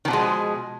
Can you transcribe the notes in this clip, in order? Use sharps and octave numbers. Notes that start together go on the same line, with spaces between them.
B2 D#3 F3 G#3